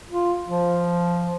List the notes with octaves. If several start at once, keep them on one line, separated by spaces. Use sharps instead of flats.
F4
F3